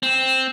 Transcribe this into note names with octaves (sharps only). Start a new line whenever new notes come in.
C4